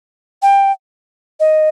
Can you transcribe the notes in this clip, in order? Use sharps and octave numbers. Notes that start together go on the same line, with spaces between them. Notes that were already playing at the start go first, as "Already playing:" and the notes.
G5
D#5